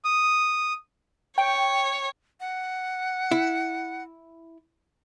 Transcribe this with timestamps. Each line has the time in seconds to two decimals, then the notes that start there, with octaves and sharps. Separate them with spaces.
0.05 D#6
1.38 C#5 G5
2.40 F#5
3.31 E4